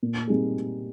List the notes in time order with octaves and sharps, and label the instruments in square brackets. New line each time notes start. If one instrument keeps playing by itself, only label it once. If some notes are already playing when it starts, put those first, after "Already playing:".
[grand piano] A#2
G3 C4 D#4 G#4